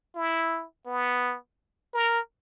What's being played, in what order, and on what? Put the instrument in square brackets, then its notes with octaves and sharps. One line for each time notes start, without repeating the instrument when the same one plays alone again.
[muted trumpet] E4
B3
A#4